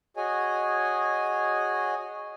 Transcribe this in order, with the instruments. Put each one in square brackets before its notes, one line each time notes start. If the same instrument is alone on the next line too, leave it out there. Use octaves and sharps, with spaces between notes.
[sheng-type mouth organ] F#4 G#4 C#5 D#5 G#5